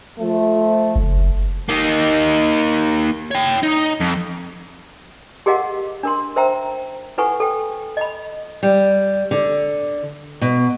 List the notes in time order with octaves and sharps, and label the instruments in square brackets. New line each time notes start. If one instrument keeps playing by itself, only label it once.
[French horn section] F3 A3
[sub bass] F#1
[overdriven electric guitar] A#3 D#4
C#5 G5
D#4
F2
[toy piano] G4 G#4 A#4 D#5 F5 F#5
D4 A#4 C6
A#4 C5 E5 G5 A#5
E4 A4 B4 F#5 G#5 C#6
A4 G5
D#5 B5
[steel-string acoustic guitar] G3
D3
B2